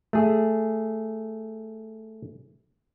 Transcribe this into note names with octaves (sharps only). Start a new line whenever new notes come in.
A3 G#4